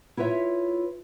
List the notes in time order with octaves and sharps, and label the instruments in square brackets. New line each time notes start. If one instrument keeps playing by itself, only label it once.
[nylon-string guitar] E4 F4 B4 C#5 E5